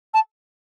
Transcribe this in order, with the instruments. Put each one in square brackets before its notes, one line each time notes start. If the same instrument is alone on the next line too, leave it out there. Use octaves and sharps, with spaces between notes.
[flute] A5